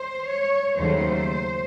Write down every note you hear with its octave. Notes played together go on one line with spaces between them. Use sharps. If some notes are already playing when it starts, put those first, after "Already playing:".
Already playing: C5
C#5
D#2 C#3 F#3 A3 C5